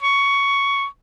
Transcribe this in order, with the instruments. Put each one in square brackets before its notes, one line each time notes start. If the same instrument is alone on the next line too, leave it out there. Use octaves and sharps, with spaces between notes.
[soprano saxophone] C#6